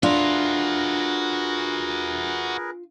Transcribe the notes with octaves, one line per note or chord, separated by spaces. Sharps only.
D4 F4 F#4 G#4 A#4 B4 E5